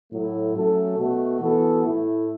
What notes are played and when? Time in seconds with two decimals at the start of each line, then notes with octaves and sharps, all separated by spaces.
0.12 A2 F#3 A3 E4
0.55 F#3 A3 C#4 A4
0.98 B2 A3 F#4
1.41 E3 B3 F#4 A4
1.84 A2 A3 E4